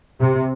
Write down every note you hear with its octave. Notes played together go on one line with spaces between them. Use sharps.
C3